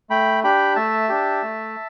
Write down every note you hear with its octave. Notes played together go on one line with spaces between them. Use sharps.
A3 G5 B5
D4 G4 G5 B5
A3 E5 A5
D4 G4
A3